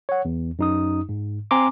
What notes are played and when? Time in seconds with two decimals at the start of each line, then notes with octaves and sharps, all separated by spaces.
0.09 C#5 F#5
0.25 E2
0.59 F#2 D#4 D#6
1.09 G#2
1.51 C4 G#5 A#5 C6 D6